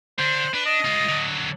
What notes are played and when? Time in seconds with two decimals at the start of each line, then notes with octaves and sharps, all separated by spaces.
0.19 D3 D4 C5
0.54 D4 B4
0.66 D#5
0.85 G#3 F4
1.09 D3 F#3